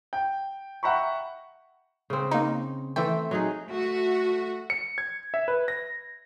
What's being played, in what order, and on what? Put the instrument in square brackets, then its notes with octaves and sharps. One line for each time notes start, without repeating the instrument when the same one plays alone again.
[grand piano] G5
E5 F#5 G5 A#5 B5 C#6
[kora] C#3 C4
[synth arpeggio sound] A#3 D#4
[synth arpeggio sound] E3 G5 [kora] A3 C4 A4
[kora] F#3 D#4 G#4
[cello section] A3 F#4
[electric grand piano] C#7
G#6
E5
B4
A#6